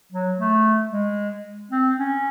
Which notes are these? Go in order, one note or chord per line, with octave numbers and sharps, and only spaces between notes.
F#3
A3
G#3
C4
C#4